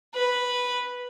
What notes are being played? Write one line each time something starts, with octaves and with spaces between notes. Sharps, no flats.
B4